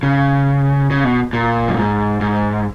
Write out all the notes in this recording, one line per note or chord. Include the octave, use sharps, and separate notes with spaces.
C#3
C#3
B2
A#2
F#2
G#2
G#2